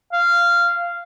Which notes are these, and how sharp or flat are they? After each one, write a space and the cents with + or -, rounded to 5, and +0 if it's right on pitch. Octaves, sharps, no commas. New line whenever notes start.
F5 -15